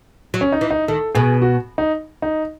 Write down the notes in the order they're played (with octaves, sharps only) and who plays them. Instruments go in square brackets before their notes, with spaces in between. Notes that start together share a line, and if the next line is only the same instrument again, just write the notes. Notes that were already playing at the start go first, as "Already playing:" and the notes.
[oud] F#3
[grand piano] C#4
D#4
[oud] E3
[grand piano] D#4
[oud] D#3 [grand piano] A4
[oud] B2 [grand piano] G#4
[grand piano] F#4
D#4
D#4